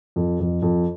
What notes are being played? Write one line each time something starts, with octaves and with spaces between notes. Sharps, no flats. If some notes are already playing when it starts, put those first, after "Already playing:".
F2
F2
F2